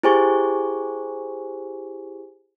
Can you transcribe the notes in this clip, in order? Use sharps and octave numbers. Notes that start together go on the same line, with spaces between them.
E4 G4 G#4 C5 G#5 C#6